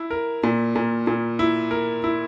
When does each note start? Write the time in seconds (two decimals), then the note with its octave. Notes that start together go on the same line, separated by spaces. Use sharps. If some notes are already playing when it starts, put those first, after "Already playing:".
Already playing: E4
0.11 A#4
0.43 A#2
0.76 A#2
1.07 A#2
1.39 E4
1.71 A#4
2.04 E4